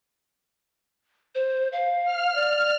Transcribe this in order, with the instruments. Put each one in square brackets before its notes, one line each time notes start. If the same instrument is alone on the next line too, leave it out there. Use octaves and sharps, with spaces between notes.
[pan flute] C5
F5
[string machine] F6
[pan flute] D5